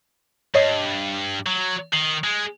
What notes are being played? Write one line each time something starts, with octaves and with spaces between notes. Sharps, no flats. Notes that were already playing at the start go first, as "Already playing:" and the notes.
G2 C#5 D#5 C7
F#3
D#3 C7
G#3